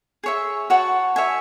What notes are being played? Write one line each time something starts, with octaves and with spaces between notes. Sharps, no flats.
G#4 C#5 E5
F#4 C#5 F#5 A5
C#5 E5 G#5